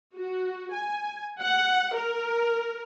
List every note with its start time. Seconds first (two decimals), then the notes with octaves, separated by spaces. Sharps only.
0.16 F#4
0.74 G#5
1.42 F#5
1.96 A#4